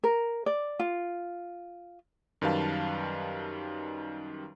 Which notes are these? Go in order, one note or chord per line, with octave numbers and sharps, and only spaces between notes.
A#4
D5
F4
F#2 D#3 G3 B4 F5 A5